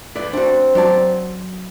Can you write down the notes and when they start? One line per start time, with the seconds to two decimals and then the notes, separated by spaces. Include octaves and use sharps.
0.16 B4 D5 E5
0.33 C4 D4 F#4
0.75 F#3 D5 A5